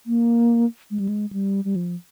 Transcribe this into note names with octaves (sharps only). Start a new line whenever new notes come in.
A#3
G#3
G3
G#3
G3
G3
F3